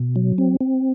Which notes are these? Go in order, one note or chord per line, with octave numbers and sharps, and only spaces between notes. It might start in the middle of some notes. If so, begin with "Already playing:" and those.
Already playing: B2
F#3
C4
C4